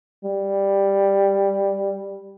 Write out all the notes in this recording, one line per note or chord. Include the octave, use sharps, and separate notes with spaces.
G3